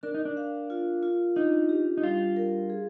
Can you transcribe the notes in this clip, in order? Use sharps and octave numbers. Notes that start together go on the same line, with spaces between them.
D4 A#4
D#4
D4
F5
F4
F4
D4 D#4
G4
D#4
G3 F4
A#4
G#4